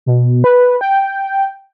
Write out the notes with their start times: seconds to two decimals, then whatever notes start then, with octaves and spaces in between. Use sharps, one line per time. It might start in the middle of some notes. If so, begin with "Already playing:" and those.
0.06 B2
0.44 B4
0.81 G5